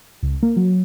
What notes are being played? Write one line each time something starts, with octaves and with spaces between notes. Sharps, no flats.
C#2
A#3
F#3